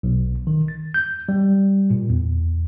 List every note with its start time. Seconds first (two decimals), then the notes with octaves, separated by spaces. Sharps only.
0.03 B1
0.47 D#3
0.68 A6
0.94 G6
1.29 G3
1.90 A#2
2.09 E2